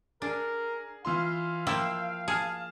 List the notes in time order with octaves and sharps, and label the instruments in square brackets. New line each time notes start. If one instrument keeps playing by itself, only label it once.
[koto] D4 [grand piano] G#4 [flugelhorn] A#4
[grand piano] E3 F4 C6 [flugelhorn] F5
[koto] F3 A#3 E4 [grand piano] G5 E6 E7
[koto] G#4 [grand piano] A5 F6